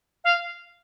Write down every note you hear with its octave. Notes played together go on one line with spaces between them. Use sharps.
F5